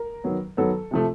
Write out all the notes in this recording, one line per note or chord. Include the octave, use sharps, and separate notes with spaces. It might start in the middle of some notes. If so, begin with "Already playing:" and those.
Already playing: A#4
D#3 F#3 B3
D#3 F#3 B3 A4
C3 F3 A3